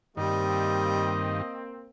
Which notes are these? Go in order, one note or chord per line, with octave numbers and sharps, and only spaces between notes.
G2 D#3 G3 A#3 C4 D#5